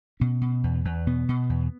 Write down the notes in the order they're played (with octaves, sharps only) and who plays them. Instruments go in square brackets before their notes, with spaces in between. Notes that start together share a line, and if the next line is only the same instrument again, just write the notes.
[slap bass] B2 C#4
B2
E2
E2
B2 B3
B2
E2